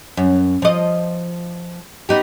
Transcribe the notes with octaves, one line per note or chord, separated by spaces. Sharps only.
F#2
F3 D#5
B3 D#4 G4